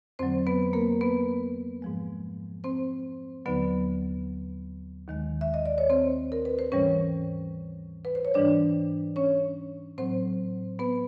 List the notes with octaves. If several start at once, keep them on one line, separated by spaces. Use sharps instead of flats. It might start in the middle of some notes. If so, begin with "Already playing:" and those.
F2 D3 F#3 C4 C5
B3 B4
A#3 A#4
B3 B4
G#2 F3 G#3
C4 C5
D#2 D3 F#3 B3 B4
D#2 D#3 G#3
E5
D#5
D5
C#5
C4 C5
A#4
B4
C5
G#2 E3 G3 C#4 C#5
B4
C5
C#5
G#2 E3 G3 D4 D5
C#4 C#5
A2 F#3 C4 C5
B3 B4